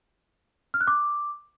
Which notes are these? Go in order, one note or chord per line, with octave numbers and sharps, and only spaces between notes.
F6
F#6
D6